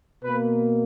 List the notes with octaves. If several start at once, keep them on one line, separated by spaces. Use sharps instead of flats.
B2 A#3 B4